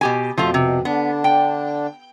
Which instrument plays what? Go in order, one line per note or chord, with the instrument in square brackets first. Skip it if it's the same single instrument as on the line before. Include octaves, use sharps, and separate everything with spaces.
[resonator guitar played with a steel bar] B2 G4 G#5
[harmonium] F2 B2 [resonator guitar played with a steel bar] F3 A3 F4
[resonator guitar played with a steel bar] C3
[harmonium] D3 D4 [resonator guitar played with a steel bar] B3
[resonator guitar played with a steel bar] G5